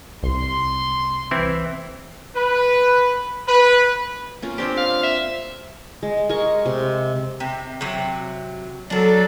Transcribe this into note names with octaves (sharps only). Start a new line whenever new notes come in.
C2 C6
E3 C4 E4
B4
B4
A#3 C#4 F4
C4 D4 G4 C5
F5
E5
G#3
G#3 G#4 A#4 C#6
C3
C3
C3 F#3
F#3 D4 A4 A#4